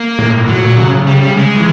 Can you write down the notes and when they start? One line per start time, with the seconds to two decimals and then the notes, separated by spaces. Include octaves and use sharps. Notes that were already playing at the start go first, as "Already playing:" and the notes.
Already playing: A#3
0.19 A2
0.28 A#2
0.33 A2
0.48 A2 F#3
0.63 A#2
0.77 C#3
1.07 G3
1.22 G3
1.37 G#3
1.56 E3